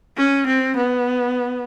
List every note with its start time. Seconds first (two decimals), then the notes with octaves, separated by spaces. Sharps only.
0.18 C#4
0.47 C4
0.77 B3